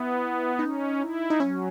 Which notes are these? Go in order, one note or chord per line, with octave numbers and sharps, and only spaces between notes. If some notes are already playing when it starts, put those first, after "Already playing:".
Already playing: B3 E4
C#4 D#4
E4
D#4
F#3 C#4